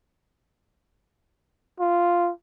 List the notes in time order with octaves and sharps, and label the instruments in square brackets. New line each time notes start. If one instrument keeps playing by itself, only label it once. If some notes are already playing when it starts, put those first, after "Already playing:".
[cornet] F4